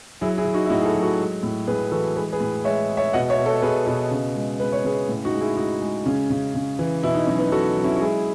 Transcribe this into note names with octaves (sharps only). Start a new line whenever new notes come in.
F#3 E4 G#4
E4 G#4
F#3
D#4 F#4
E4
A2 D#4 F#4
G#4
F#4 A4
F#3
F#4 A4
G#3
A2
A2 G#4 B4
E3 F#4 A4
G#3 G#4 B4
G#4 B4
A2
G#3 C#5 E5
G#3
C#5 E5
B2 D#5 F#5
C#5 E5
B2
A4 C#5
B2 G#4 B4
B2
C#3
G#3
G#3 B4
C#5
C#3 G#4 B4
A2
D#4 F#4
G#3
E4 G#4
G#3 D#4 F#4
G#3
C#3 C#4
C#3
C#3
E3
B2 E4
D#4
F#3 C#4
B3 D#4
F#3 F#4 A4
F#3
C#4 E4
F#4
G#3 E4 G#4